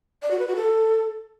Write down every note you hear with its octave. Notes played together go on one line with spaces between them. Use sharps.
D5
F#4
B4
F#4
A4